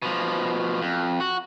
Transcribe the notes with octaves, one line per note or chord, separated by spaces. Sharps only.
B2 F3
F2
F#4